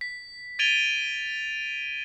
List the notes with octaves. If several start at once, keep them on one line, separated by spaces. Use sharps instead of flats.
B6
G#6 A6 D7 D#7 F7 G7